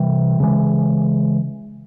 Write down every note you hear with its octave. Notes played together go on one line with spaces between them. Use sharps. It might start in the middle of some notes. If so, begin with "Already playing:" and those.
Already playing: C3 E3 G3
C#3 E3 G#3